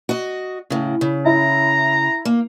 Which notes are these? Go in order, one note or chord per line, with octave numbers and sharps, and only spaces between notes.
F#4 D#5
A2 C#3
C#3
E4 A#5
A#3